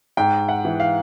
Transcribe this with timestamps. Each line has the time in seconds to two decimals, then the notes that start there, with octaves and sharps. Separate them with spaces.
0.17 G#2 G5
0.49 F#5
0.65 E3
0.80 F5